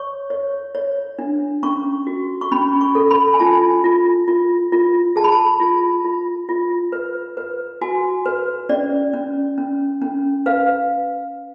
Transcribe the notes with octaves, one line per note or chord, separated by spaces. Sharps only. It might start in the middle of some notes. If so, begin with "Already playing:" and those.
Already playing: C#5 C#6
C#5
C#5
D4
C#4 C#6
F#4
C#6
C#4 B5
C#6
A4
B5
G#5
F4 A5
F4
F4
F4
G#4 A5
B5
A5
F4
F4
F4
B4
B4
F#4 G#5
B4
C#4 D5
C#4
C#4
C#4
B4 F5